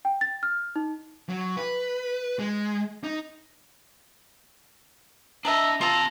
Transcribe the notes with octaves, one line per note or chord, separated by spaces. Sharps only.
G5
A6
F6
D#4
F#3
B4
G#3
D#4
D4 D#5 E5 A5 A#5
C4 F4 A5 A#5 E6